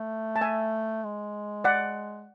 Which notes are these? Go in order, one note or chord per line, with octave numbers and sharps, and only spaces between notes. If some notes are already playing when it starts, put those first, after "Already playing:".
Already playing: A3
A5
E5 G#5
G#3
D5 F#5